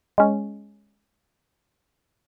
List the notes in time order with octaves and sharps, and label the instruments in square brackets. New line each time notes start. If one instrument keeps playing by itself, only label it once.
[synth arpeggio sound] G#3 C#4